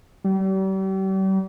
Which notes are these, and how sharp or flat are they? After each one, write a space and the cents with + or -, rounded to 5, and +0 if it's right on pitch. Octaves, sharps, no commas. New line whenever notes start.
G3 -40